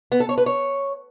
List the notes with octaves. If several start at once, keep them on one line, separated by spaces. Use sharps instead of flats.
B3
A4
C#5
B4
C#5